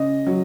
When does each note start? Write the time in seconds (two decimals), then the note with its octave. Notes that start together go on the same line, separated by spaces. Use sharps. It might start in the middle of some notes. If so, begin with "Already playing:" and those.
Already playing: C#3 D#5
0.27 F#3